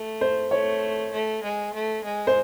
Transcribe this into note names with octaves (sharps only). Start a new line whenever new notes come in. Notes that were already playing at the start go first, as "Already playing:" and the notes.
Already playing: A3
C5
A3 C#5
A3
G#3
A3
G#3
C5